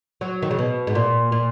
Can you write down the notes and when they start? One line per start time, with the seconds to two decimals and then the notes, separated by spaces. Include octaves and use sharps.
0.21 F#3
0.42 D#3
0.51 C#3
0.58 B2
0.87 G#2
0.95 A#2
1.32 A#2